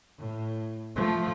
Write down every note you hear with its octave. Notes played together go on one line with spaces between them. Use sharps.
A2
F3 A3